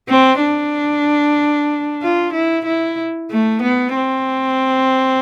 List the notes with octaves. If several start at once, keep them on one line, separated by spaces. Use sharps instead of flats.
C4
D4
F4
E4
E4
A3
B3
C4